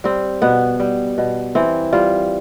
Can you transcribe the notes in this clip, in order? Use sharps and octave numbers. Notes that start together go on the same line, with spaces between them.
G3 C4
B2 B3
G3
B2
E3 C4
G3 F4